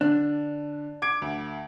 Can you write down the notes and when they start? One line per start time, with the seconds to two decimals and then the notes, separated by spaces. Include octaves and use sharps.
0.01 D3 D4
1.02 D6 G#6 D7
1.22 D2